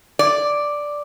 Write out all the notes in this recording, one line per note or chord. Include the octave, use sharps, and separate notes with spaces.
D5